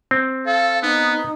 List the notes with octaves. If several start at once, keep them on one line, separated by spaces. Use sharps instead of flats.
C4
A4 F5
B3 D#4